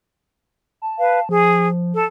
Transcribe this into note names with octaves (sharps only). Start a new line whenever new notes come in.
A5
B4 F5
F3 G#4
A4